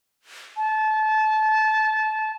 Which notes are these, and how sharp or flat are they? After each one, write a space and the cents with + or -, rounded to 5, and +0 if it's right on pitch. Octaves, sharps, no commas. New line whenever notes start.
A5 -25